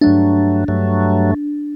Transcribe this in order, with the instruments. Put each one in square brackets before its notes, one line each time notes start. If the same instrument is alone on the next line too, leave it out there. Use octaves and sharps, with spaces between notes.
[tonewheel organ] G2 F#3 A3 [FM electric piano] D4
[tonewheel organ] G2 F#3 A3